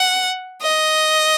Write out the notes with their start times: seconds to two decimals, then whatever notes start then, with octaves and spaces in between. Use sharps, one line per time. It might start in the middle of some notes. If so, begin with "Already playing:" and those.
Already playing: F#5
0.62 D#5